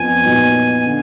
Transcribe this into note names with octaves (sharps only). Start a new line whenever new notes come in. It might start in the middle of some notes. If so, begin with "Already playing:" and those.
Already playing: F2 F3 B3 G#5
A#2 F#3 B3 D#4
D3